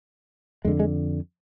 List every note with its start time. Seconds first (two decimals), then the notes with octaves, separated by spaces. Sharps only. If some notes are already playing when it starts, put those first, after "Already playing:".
0.65 F2 D3 G#3
0.80 G#3